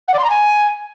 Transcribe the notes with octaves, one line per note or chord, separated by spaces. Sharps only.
F#5
D5
C6
A#5
G#5